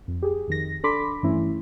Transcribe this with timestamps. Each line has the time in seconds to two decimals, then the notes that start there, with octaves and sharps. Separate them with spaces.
0.08 F2
0.23 G4 G#4
0.48 F2 D#3 A#6
0.84 D4 A4 B5 C6 D6 B6
1.23 G2 E3 A3 C#4 E4